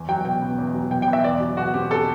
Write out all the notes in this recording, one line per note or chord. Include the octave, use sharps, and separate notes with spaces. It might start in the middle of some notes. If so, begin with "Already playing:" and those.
Already playing: E2
F#3 G5
B2 G5
B3
E2
F#3
B2 G5
G5
B3
E5
E2 D5
F#3
B2 F#4
C4 G4
A4